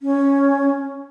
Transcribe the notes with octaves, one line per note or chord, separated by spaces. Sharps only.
C#4